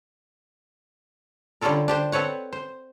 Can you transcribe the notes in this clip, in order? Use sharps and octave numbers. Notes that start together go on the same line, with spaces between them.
D3 G3 C#4 F4 A4 A#4
D4 G4 C5
C4 A4 B4 C#5 F#5
C5